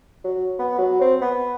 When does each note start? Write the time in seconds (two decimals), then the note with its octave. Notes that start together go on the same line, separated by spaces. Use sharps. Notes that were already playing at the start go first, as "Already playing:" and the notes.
0.24 F#3
0.59 B3
0.78 F#3
1.01 C4
1.21 B3